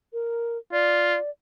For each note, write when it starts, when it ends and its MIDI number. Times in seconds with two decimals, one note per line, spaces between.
0.13 0.58 70
0.72 1.16 65
0.72 1.30 74